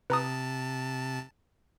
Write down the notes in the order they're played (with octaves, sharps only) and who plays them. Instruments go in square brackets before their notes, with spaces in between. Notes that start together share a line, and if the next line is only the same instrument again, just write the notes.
[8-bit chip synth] C3 A5 [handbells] B4 A#5 D#6